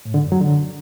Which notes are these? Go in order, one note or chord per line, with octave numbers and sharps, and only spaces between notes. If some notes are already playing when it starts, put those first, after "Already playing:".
A2
D3
F#2
F#3
D3